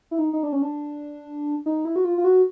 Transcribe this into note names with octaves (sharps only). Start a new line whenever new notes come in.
E4
D#4
D#4
D4
C#4
D4
D#4
E4
F#4
F4
F4
F#4